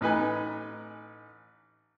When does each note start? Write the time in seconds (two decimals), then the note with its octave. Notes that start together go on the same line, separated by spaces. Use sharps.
0.01 A1 D#4 B4 G#5